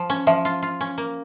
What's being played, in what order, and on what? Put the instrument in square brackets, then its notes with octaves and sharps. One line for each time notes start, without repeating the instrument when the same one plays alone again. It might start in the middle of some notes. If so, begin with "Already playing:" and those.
Already playing: [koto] F3
C#4
[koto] F3 [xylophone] E5
[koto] F4
F4
C#4
A#3